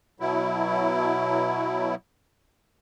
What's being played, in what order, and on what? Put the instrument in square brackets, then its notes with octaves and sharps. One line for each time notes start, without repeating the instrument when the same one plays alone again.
[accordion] B2 F#3 E4